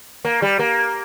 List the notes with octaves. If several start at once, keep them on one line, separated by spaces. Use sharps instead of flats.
A#3
G3
A#3